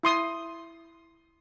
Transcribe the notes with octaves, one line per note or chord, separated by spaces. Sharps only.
E4 C6 D#6